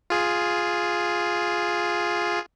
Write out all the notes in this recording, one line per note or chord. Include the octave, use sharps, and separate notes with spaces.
F4 G#4